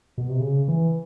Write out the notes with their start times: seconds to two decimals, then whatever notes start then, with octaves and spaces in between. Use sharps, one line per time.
0.18 B2
0.29 C3
0.40 C#3
0.68 E3